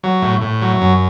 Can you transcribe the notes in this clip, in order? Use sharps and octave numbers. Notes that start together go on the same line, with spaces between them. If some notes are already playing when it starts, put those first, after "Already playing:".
F#3
A2
A2
F#3
F#2